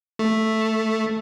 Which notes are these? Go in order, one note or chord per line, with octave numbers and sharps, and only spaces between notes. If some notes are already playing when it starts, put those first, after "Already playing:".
A3